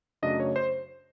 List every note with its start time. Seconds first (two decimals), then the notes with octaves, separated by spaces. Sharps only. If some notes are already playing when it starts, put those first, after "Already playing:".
0.22 F#2 C#3 F#3 A3 D4 D#5
0.40 C#5
0.56 C5